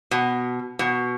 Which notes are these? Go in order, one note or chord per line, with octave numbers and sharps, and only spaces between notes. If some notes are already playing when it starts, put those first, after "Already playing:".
B2
B2